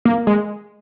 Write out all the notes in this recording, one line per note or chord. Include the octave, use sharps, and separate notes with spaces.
A#3
G#3